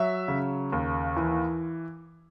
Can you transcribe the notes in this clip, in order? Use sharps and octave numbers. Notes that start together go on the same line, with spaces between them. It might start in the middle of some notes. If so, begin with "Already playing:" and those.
Already playing: F#3 E5
C#3
D#2
E3